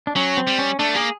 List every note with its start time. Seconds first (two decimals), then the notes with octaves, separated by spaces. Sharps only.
0.07 D4
0.16 F#3 C#4
0.37 C4
0.47 G3
0.59 C#4
0.79 A3 D4
0.94 A#3 G#4